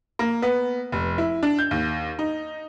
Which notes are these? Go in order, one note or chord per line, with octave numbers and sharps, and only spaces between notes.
A#3
B3
F1
E4
D4
G6
D#2
D#4